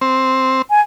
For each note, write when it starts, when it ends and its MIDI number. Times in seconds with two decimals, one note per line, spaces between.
0.01 0.62 60
0.70 0.80 80